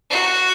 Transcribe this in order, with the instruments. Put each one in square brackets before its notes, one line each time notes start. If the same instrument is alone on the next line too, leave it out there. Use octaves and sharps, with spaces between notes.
[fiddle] F#4